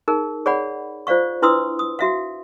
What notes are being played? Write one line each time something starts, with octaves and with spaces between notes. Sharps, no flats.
D#4 G#4 A#4
G#4 C#5 D5 F#5 B5
F4 C5 D5 F5 C#6
D4 E4 B4 C6 D#6 E6
D#6
F#4 E5 F5